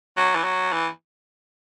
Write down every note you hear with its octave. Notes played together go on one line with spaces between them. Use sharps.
F#3
E3
F#3
E3